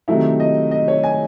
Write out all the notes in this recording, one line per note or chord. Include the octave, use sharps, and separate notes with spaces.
C3 D#3 F#3 A3 D#4 E4
D#5
D#5
C#5
G#5